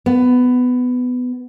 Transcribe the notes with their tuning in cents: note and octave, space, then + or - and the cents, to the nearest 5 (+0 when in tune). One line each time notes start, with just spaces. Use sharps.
B3 +15